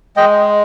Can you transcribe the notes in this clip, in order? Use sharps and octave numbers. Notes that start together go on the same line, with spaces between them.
G#3 D#5 G5